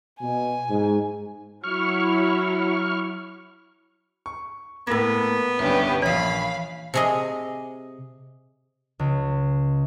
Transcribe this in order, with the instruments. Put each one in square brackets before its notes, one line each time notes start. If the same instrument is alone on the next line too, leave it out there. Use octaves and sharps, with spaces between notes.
[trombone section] B2 [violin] G#5
[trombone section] G#2
[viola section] F#3 E4 [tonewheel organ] C#6 F6
[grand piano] C#6
[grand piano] A2 A#3 [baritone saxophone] B3 [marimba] E6 A#6
[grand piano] C2 G2 [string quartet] D3 C#4 G4 [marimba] B4
[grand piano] A#1 C#5 [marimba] E3 D#6 [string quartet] F5 B5
[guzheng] C3 G#4 D#5
[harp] C#2